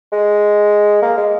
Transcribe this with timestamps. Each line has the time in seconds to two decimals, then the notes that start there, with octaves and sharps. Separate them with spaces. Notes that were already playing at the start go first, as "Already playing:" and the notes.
0.12 G#3
1.02 A#3
1.17 G#3